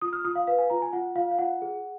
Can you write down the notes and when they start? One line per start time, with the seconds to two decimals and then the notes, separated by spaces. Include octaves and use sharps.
0.02 F4 D#6
0.13 F6
0.25 F4 D#6
0.36 F5
0.47 B4 F5
0.59 G#5
0.70 F4 A#5
0.82 G#5
0.93 F4 F#5
1.16 F4 F5
1.31 F5
1.39 F4 F#5
1.62 G#4